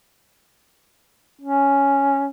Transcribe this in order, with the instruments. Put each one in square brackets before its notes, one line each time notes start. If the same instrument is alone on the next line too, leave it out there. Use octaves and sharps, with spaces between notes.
[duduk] C#4